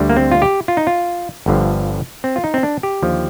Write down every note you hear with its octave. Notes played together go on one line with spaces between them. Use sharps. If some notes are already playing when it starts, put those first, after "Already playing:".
Already playing: D2 D3 G3
A#3
C4
F4
G4
F4
D#4
F4
G1 G2 D3 F3
C4
F4
D#4
C4
D4
G4
D#2 D3 F3